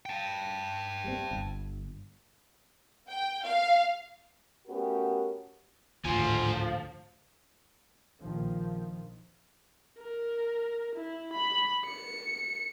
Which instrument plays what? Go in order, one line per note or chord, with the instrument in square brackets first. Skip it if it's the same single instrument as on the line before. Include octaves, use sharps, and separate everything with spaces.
[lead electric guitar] G5 A5
[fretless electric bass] G3 A3 C4
G1
[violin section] G5
F5
[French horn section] A3 B3 C#4 F#4 G4 A#4
[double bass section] G#1 A2 [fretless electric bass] D2 [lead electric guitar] F3 [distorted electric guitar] C5 G#5
[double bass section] A#1 D#3 F3
[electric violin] A#4
E4
B5
C#7